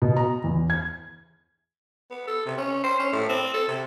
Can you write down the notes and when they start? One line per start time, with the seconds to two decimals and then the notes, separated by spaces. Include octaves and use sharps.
0.02 B2
0.16 A#5
0.44 E2
0.70 G#6
2.10 B3
2.27 A4
2.46 C3
2.58 C#4
2.84 C5
2.99 C#4
3.12 A2
3.29 C4
3.54 A4
3.68 C3